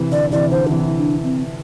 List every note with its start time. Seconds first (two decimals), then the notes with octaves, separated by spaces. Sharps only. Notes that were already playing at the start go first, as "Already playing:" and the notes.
Already playing: C3 E3
0.11 D3 D5
0.31 C3 E3 D5
0.51 D3 C5
0.67 D4
0.71 C3 E3 E4
0.98 D4
1.24 C4